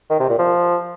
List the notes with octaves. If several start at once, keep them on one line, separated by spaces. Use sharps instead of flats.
D#3
C3
A#2
F3